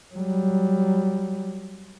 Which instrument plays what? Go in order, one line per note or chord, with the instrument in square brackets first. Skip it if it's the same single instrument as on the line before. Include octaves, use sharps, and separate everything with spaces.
[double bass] F#3 G3